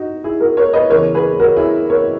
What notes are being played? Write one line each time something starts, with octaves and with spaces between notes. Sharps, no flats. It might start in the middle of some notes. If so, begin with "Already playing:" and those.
Already playing: D#4 F#4
E4 G#4
F#4 A#4
A#4 C#5
B4 D#5
E2 C#3 E3 A#4 C#5
G#4 B4
F#4 A#4
E4 G#4
A#4 C#5